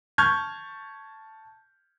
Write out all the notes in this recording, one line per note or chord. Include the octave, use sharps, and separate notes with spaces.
A5 C#6 F6 G6 G#6